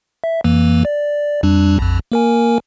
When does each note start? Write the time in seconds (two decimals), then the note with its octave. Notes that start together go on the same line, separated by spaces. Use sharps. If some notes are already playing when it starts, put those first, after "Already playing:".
0.24 E5
0.44 F2 E3 A#3
0.85 D5
1.43 F2 G3 D4
1.79 A#1 F2
2.12 A#3 A#4 G#5